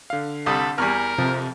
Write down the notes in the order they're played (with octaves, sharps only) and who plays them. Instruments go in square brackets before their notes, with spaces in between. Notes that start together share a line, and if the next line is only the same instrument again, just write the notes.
[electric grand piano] D3 F5
[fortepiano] C2 G3 D#6 [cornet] A4
[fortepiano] E2 G3 [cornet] A#4 [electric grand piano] G#5 C#6 F6
[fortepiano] F2 [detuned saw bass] C3 [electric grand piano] F3